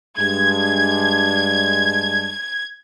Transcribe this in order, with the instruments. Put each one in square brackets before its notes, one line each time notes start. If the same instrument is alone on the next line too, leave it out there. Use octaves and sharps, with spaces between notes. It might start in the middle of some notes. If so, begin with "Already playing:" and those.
[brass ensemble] G2 G#3 D4 [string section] G#6